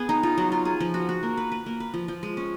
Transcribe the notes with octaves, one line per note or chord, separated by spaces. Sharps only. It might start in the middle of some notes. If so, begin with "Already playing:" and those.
Already playing: B3 G#4
D#4
F4
F#3
F4
G#4
F3
F#4
F#4
A#3
B4
B4
A#3
B4
F3
F3
G#3
C#4